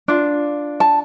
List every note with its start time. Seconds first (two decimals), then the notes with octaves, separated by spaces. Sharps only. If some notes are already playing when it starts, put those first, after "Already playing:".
0.08 D4 F4
0.80 A5